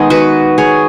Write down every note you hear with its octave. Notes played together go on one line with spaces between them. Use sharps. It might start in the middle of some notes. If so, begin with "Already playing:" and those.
Already playing: D#3 G#3 B3 D#4 G#4
F#4 B4
G#4 C#5